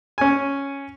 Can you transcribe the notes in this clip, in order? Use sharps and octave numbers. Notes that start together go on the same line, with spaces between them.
C#4 G#5